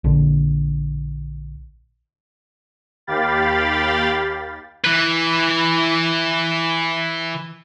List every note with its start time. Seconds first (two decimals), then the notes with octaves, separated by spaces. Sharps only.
0.04 A#1 D3
3.07 D#2 G4 F5 G5 B5 A6
4.85 E3 B4